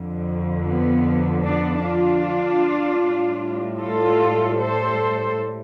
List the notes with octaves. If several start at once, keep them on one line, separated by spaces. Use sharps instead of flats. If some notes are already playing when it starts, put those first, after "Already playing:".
Already playing: F2 D3 F3
B3
B3 D4
D4 F4
A2 G3
F4 A4
A4 C5